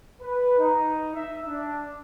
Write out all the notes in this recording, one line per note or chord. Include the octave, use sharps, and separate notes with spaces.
B4
D#4
E5
D4